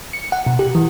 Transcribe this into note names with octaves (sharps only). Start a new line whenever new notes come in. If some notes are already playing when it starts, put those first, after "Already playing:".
C#7
F#5
B2
G4
E3